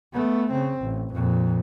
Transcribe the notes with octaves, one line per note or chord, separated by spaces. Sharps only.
A3 B3
C#3 C4
A1
F2 A#2